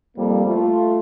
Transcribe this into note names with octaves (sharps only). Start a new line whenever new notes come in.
F2 G3 A#3
A3 F4